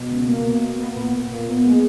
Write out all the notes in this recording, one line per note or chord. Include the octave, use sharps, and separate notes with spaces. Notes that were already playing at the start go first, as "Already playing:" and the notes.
Already playing: B2
C#2
A#3
B2
A#3
B3
A#2
A#2
A#2
B3
G#3